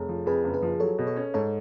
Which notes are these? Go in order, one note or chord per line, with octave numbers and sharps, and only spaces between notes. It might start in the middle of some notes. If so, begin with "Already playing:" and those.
Already playing: F1 G#4 A4 C#5
F3
F2 G#4 B4
F#1
G#4 B4
F3
F#3 A4 C#5
B2
A4 C#5
C#4
G#2 A4 C#5